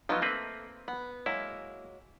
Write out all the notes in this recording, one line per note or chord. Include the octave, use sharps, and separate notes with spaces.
F3 F#3 B3 D#4 F4
A3 A#3 C4 B4 E5
B3
F#3 G#3 A#3 E4